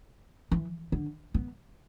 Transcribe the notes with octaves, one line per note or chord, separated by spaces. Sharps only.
E3
D3
B3